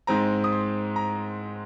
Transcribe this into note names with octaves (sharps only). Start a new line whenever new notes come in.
G#2 G#3 C4 A#5
D#6
C6
A#5